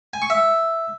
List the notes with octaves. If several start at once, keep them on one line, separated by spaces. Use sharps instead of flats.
G#5
C#6
E5